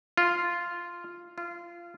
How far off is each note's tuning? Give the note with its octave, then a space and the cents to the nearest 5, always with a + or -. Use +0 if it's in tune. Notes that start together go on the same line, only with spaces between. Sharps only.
F4 -5
F4 -20